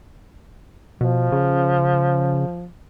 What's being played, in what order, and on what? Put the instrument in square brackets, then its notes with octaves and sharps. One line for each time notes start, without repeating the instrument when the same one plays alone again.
[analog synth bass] B2 [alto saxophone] F3
[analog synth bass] C#3